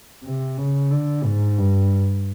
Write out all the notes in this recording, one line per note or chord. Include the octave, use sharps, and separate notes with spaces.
C3
C#3
D3
G#2
G2